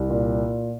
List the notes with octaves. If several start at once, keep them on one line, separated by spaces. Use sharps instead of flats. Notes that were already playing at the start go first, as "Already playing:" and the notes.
Already playing: C2
A#2